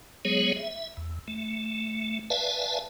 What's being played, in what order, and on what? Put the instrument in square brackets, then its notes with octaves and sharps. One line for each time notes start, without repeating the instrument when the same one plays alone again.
[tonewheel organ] F#3 G#3 B3 G#4 C#5
E5
E2
A3
B4 D5 E5 F5 G#5 A5